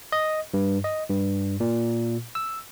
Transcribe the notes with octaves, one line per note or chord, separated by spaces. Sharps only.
D#5
G2
D#5
G2
A#2
E6